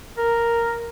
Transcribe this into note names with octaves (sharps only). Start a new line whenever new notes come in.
A#4